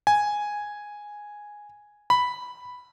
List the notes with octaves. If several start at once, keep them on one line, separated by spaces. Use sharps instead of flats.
G#5
B5